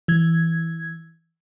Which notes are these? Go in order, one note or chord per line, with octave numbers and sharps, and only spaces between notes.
E3 G#6